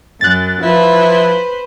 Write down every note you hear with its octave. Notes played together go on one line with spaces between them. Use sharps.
F#2 F#6 A6
F3 E4 B4 C5